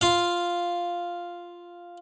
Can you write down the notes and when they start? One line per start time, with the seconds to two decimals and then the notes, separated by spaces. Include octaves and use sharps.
0.01 F4 F5